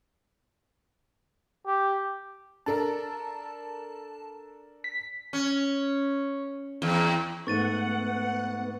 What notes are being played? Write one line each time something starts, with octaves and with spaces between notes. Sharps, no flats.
G4
D4 A4 A#4 A5
B6
C#4
E2
G#2 A3 B3 F#5 C#6 A6 D#7